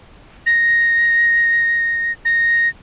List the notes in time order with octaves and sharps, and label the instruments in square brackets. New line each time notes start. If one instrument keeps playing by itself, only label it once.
[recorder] A#6
A#6